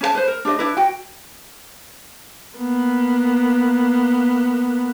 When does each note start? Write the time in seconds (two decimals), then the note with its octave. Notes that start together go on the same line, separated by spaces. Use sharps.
0.01 C#4 A#4 A5
0.15 B4 C5
0.28 A#4
0.45 D4 G4 C5 D#5
0.59 D4 E4 B4
0.77 F#4 G5
2.58 A#3 B3